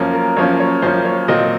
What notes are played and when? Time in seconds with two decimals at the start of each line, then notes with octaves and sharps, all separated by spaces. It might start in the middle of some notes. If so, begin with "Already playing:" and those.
Already playing: F#2 F3 A#3 C#4
0.14 A#4
0.36 F#2 F3 A#3 C#4 C#5
0.60 C#5
0.82 F#2 F3 A#3 C#4 C5
1.05 C#5
1.28 A#2 F#3 C4 D#5